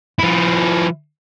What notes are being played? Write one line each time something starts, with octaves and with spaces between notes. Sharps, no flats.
F3 E4